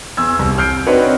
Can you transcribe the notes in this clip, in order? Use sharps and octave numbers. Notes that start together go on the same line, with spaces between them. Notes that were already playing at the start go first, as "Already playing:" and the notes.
E2 E6 G#6
C2
F6 G6 C7 D7
C4 D4 D#4 F#4 B4 C#5